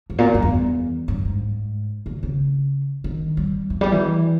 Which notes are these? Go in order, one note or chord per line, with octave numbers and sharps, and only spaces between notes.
G2
A#2
G2
E2
G2
G#2
A#2
C#3
D#3
G3
E3
G3
E3